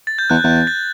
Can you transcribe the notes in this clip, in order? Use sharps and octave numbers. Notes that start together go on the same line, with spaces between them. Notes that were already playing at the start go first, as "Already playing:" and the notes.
A6
G6
E2 F#6
E2 G6
A6